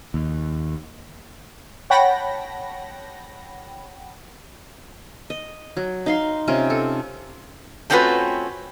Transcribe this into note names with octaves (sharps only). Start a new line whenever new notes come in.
D#2
C#5 F#5 G5 A5 B5 A#6
D#5
F#3
D#4 F5 C6
C3 C#4 F4 A#4
A4
A3 C4 C#4 F4 F#4 B4